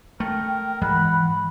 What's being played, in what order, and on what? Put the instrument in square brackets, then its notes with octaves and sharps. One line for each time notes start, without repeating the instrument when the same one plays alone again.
[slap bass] A3 [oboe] A#4 [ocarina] G5
[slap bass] G#2 [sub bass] E3 [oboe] F#5 [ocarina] B5